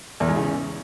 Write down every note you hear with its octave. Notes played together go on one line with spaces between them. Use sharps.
E2
G#2
C#3